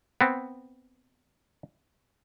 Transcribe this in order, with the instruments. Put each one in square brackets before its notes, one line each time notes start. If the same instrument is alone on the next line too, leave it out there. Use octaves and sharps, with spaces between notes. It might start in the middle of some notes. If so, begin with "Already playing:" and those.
[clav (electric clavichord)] B3 C4